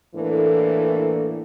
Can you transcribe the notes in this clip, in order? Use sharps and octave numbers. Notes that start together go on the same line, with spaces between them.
A2 E3 A#3 D4 A4